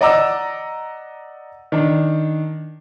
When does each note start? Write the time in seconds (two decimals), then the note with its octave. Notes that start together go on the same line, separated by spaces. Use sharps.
0.01 D5 D#5 F#5 A#5 D6 E6
1.72 D#3 D4